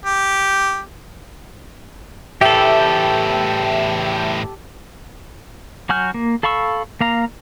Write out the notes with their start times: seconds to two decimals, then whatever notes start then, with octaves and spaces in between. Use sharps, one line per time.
0.05 G4
2.41 E2 A2 G4 A4 E5 G5 G6
5.89 F#3 F#4 G#5 F6 G6
6.14 A#3
6.43 A4 F5 B5 C#6 E6
7.01 A#3 F5 A#5